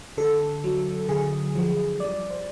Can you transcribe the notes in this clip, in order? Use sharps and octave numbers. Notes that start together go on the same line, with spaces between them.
D3 A4
F#3
D3 G#4
F3
G3 D5
C5